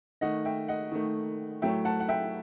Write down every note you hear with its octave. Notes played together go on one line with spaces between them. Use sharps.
D#3 A3 D#5 F#5
E5 G5
D#5 F#5
D#3 A3
A2 F#3 A3 E5 G5
F#5 A5
F#5
E5 G5